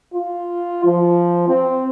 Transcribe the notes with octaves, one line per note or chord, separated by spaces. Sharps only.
F4
F3
C4